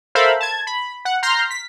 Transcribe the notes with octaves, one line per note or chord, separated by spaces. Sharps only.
A4 A#4 C5 E5 F5 B5
A5 G#6
B5
F#5
A#5 C6 F6 G6 A#6 C7
B6